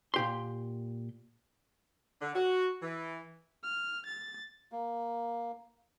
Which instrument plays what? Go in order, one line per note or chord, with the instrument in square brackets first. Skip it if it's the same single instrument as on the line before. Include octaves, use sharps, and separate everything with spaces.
[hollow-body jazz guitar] A#2 G4 C6
[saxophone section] D3
F#4
E3
[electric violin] F6
A6
[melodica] A#3